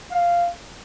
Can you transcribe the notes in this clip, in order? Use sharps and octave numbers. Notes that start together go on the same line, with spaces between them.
F5